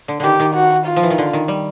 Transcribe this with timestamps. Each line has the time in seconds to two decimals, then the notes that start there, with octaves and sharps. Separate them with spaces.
0.08 D3
0.20 D3 D#3 G4
0.40 D#3
0.55 F#4
0.86 F4
0.96 F3
1.03 E3
1.10 D#3
1.18 D3
1.33 D#3
1.48 G3